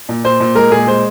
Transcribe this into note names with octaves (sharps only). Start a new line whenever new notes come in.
A#2
A#2 C5
A#2
G#3 A#4
A#2 G#4
G#3 C5